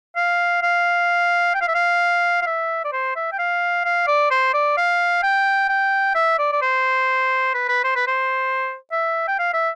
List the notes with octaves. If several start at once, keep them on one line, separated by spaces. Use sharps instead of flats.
F5
F5
G5
F5
E5
F5
F5
E5
D5
C5
E5
G5
F5
F5
D5
C5
D5
F5
G5
G5
E5
D5
D5
C5
B4
B4
C5
B4
C5
E5
G5
F5
E5